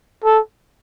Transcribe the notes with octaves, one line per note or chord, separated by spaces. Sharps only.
A4